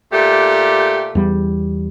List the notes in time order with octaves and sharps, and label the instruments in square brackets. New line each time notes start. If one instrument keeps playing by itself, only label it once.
[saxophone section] A#2 A3 G4
[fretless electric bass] E2 G3